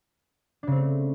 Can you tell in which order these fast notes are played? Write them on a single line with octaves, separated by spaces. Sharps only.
D4 C#3 C4 A3